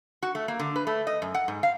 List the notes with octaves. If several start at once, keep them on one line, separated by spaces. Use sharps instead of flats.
F#4
A3
A#3
D3
B4
A3
D#5
F#2
F#5
G#2
F5